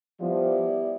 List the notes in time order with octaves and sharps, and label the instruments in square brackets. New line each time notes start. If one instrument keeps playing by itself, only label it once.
[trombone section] F3 [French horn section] G3 B3 E4 G4 D5